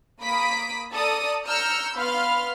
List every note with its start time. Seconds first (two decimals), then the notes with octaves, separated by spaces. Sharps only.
0.22 A#3 B5 D#6 B6 D7
0.92 A4 D5 A#5 D#6
1.45 A#5 E6 F6 G6 C#7
1.96 B3 F5 B5 C6 F6